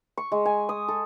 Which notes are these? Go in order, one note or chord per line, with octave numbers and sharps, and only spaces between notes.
C#6
G#3
G#5
D#6
A4